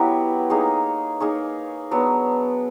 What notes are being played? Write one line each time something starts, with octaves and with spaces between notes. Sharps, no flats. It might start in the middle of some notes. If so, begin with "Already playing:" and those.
Already playing: F#3 B3 E4 G4
A#3 D#4 G#4 C#5
A#3 D#4 G#4 C#5
F#3 B3 D4